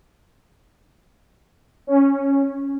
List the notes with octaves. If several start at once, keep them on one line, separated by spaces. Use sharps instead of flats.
C#4